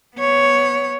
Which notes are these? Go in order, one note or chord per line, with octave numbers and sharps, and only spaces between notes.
B3 C#5